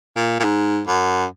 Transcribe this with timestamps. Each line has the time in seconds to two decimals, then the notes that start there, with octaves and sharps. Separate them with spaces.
0.16 A#2
0.40 A#2
0.44 G#2
0.87 F#2